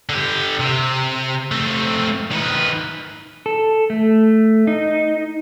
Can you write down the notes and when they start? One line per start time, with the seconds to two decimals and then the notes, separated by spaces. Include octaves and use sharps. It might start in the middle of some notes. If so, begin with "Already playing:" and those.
0.10 D3 G4
0.59 C3
1.52 A3 C4
2.31 D#3 B4
3.46 A4
3.90 A3
4.67 D#4